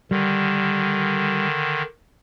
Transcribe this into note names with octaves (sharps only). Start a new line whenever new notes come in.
D3 D#3 G3